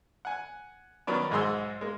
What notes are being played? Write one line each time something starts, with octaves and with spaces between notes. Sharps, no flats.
F#5 G#5
D#3 F#3 B3 C#4 D5
B1 G#2 G#3 G#4 C6 E6
G#3 A#3